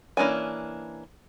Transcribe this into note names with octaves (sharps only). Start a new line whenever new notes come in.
E3 A#3 C#4 D4 G#5